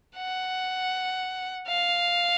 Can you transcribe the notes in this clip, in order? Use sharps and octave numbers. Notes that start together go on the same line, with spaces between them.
F#5
F5